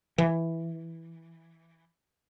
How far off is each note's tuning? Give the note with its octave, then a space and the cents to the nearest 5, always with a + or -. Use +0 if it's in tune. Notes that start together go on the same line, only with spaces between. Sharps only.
E3 +0